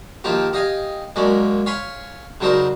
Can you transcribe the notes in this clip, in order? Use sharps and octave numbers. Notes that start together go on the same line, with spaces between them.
D#3 F3 A#3 F4 G4
G4 D#5 F5 G#5
F#2 G#3 A#3 C#4 D4
C#5 F5 G#5 B5 C6
C#3 F#3 D4 D#4 A#4 C5